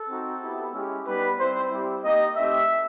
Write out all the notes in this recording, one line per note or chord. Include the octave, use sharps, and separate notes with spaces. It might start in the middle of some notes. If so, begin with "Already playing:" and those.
Already playing: A4
C4 D#4 F#4
B3 E4 G4
G#3 C#4 E4 G4
G3 B3 D#4 G4 B4
G3 C4 E4 C5
G3 C4 E4 G4
A#3 D#4 G4 D#5
A3 C4 D#4 G4 E5